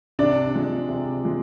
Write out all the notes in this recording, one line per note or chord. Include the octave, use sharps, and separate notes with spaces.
C3 D4 D5
F3 G#3
C3
F3 G#3